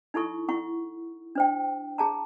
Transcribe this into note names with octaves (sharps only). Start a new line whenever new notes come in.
D#4 E4 A4 C#6
E4 F#5 C#6
D4 C5 G5
G#4 A5 A#5